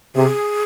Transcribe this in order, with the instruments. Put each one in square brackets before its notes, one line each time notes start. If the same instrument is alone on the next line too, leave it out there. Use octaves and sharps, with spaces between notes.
[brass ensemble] C3 [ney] G#4